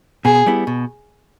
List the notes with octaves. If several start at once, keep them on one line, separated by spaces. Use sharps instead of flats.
B2 G#4
G3 B3 E4
B2